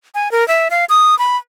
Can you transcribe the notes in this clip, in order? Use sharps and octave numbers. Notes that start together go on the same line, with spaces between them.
G#5
A#4
E5
F5
D#6
B5